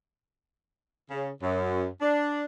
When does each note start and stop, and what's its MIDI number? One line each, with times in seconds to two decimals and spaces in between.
1.10 1.29 49
1.42 1.87 42
2.00 2.44 62